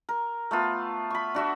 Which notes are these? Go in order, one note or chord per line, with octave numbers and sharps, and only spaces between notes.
A#4
A3 B3 F4
B5 C#6
D4 F#4 E5